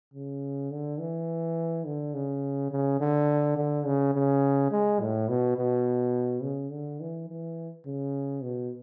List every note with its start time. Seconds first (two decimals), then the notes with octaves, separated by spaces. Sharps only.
0.14 C#3
0.71 D3
0.99 E3
1.86 D3
2.14 C#3
2.72 C#3
3.00 D3
3.57 D3
3.86 C#3
4.14 C#3
4.71 G#3
5.01 A2
5.28 B2
5.57 B2
6.43 C#3
6.71 D3
7.00 E3
7.29 E3
7.86 C#3
8.43 B2